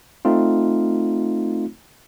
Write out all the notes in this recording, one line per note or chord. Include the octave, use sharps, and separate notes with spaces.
A3 C4 D#4 F4